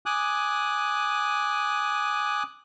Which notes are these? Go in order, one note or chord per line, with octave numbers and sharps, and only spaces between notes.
G#5 D6 D#6 F#6